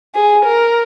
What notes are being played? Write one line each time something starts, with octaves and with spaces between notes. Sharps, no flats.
G#4
A#4